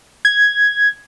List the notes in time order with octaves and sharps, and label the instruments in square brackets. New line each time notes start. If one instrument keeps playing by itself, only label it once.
[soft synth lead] G#6